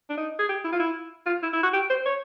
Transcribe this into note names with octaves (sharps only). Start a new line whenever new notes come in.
D4
D#4
G#4
G4
E4
F4
E4
F4
E4
E4
F#4
G4
C5
C#5